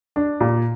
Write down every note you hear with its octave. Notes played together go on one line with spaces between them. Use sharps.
D4
A#2